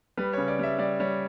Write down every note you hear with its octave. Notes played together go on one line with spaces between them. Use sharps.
G3 B4
C#3 C#5
D5
G3 E5
G3 D5
G3 C#5